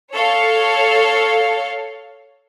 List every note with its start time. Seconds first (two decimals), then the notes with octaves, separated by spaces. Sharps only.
0.13 A4 C#5 F5